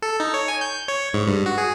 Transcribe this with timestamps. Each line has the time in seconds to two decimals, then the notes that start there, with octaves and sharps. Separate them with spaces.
0.02 A4
0.20 D#4
0.34 C#5
0.48 G#5
0.61 G6
0.88 C#5
1.14 G#2
1.27 G2
1.46 F#4
1.58 G#4